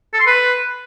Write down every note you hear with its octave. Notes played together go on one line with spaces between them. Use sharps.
A4
C6
B4